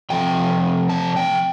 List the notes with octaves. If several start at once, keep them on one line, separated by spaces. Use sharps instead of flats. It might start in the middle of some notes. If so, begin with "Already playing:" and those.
C3 F3 A3 C4 G5
A5
G5